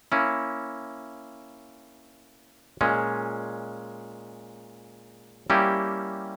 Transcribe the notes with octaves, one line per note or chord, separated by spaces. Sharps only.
A#3 C#4 E4
A#2 G#3 C#4
G3 A#3 C#4 E4 G4